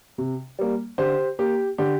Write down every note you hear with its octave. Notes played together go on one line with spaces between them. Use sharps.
C3
G3 A#3
D3 G4 C5
A#3 G4
D3 G4